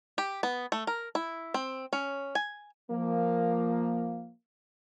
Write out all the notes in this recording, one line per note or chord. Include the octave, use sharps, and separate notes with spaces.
G4
B3
A3
A#4
E4
C4
C#4
G#5
F3 A#3